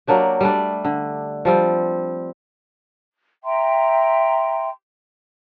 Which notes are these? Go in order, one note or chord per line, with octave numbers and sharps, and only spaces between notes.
F#3 A#3 D4 G4
G3 A3 D4
D3
F3 G3 C4
E5 G5 A#5 C6